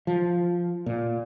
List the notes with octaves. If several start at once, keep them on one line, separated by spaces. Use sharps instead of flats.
F3
A#2